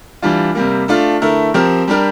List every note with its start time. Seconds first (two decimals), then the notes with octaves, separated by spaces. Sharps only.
0.22 E3 G3 D4 F4
0.55 C3 G3 A#3
0.88 A3 D4 F4
1.21 D3 A3 E4 A#4
1.54 F3 C4 G4 A#4
1.88 G3 D4 G4 A#4